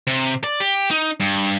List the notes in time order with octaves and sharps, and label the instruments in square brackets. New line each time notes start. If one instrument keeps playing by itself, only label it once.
[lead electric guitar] C3
D5
G4
D#4
G2